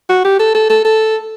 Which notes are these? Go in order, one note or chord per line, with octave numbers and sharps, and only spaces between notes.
F#4
G4
A4
A4
A4
A4